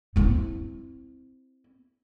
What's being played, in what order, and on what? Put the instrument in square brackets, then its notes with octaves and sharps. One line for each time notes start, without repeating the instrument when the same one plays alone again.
[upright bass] C4 E4